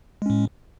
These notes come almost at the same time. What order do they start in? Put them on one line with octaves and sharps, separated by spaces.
G#3 C#4 A2